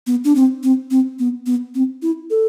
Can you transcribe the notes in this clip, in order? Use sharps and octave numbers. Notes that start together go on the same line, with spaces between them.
B3
D4
C4
C4
C4
B3
B3
C4
E4
A4